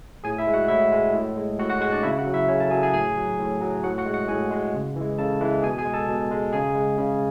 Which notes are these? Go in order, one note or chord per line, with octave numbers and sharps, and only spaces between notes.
A2 G#4 G#5
E4 E5
G#3
F#4 F#5
A2 E4 E5
G#3
A2
G#3
A2 F#4 F#5
F#4 F#5
G#3 F#4 F#5
D4 D5
C#3 E4 E5
F#4 F#5
F#3
E4 E5
C#3 C#4 C#5
A4 A5
F#3 G#4 G#5
G#4 G#5
A2 G#4 G#5
F#3
A2
F#3
A2 F#4 F#5
F#4 F#5
G#3
F#4 F#5
A2 G#4 G#5
G#3
C#3
E3
G#3
C#3 A4 A5
E3 G#3
B2 G#4 G#5
G#4 G#5
G#3
A4 A5
B2
G#3
C#3 G#4 G#5
G#3
C#3